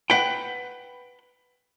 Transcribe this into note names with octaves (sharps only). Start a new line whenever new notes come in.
B4 F#5 G5